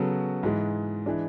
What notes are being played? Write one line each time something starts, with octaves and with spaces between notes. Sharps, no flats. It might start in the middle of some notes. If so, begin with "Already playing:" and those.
Already playing: C#3 F#3 B3 F#4 A4
G#2 E3 G#3
E3 G#3 D4